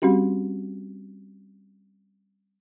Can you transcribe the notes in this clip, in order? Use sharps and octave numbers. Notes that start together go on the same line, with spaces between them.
G3 C4 C#4 F#4 G4